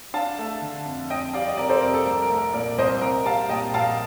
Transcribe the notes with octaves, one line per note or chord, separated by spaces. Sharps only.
D4 F5 A5
A3
D3
F2
F2 D#5 G5
G3 D5 F5
D#5
C3 A#4 D5
A4 C5
F2 A#4
A4
C2 A#4
A#4
A3
A#4
A#2 A#4 D5
C2 C5 D#5
C4 A#4
G3 F5 A5
A#2 D#5 G5
A#1 F5 A5